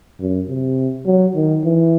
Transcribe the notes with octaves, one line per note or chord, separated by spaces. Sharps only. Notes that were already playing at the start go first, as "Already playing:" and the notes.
F#2
C3
F#3
D#3
E3